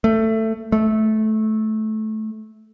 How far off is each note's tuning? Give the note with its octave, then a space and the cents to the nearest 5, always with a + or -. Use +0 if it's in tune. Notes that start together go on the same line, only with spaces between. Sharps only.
A3 +15
A3 -15